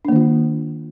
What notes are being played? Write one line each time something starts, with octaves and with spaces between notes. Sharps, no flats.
D#3 A#3 D4 F4